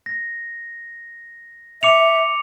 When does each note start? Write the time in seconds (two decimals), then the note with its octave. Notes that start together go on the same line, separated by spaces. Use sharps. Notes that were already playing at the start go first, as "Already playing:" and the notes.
0.06 A#6
1.83 E5 D6 C#7 F7